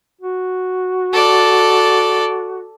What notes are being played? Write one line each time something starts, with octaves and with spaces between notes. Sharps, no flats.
F#4
A4 D5